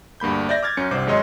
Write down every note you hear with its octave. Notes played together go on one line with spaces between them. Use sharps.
D2 G2 A#3 B5 G6
D5 E5 G6 A#6
D6 F6 G#6 A6
F#2 C#4 C#7
C2 G2 C5 D6
G#1 F#2 G#3 C#5 D#5 C6